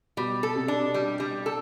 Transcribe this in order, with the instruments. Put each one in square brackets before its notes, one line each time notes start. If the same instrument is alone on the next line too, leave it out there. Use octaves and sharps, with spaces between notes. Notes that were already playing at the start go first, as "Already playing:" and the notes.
[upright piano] B2 [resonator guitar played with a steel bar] G3
[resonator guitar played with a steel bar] A4
[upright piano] C3
[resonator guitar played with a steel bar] D4
G3
G3
A4